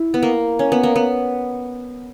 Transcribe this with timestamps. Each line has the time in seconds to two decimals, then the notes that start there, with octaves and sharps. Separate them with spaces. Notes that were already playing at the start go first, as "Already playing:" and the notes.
Already playing: E4
0.14 B3
0.23 A#3
0.59 C#4
0.72 B3
0.83 A#3
0.96 B3